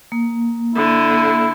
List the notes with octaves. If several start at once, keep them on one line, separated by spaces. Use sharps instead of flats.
A#3
D3 E4